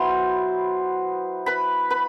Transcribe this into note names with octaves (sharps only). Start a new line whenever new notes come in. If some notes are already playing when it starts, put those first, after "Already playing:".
Already playing: F#3 B3 E4 C5 C6
B4 B5
B4 B5